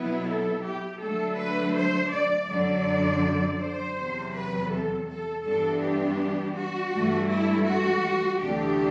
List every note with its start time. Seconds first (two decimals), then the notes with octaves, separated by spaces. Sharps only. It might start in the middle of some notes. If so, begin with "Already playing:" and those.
Already playing: B2 F#3 B3 E4 B4
0.26 A4
0.64 G4
1.00 D3 F#3 A3 D4 A4
1.37 B4
1.75 C5
2.11 D5
2.49 F#2 D3 F#3 D5
3.60 C5
3.96 E2 C3 F#3
4.34 B4
4.70 A4
5.08 A4
5.44 G2 E3 B3 D4 A4
5.81 G4
6.55 F#4
6.92 G2 E3 A3
7.29 E4
7.66 F#4
8.40 D2 C3 E3 A3 D4 G4